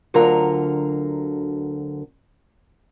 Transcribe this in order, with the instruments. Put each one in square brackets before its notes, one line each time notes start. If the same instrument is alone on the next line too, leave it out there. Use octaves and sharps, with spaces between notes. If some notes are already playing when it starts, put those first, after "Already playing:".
[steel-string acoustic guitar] D2 D3 F#3 F4 A#4 A#5